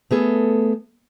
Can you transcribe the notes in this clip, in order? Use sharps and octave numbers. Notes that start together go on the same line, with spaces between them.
A3 B3 G#4 A4